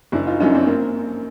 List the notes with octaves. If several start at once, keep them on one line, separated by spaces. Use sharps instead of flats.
F#1 D4 E4
D#4 F4
F#2 D3 C#4 D#4
C4 D4
A#3 C4